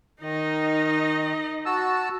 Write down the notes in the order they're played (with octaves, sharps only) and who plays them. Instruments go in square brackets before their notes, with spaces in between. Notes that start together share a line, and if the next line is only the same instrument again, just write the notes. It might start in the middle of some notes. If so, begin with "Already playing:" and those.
[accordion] D#3 [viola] D#4 D#5
[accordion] F#4 A5 E6